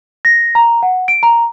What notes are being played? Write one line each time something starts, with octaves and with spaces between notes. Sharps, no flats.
A#6
A#5
F#5
D7
A#5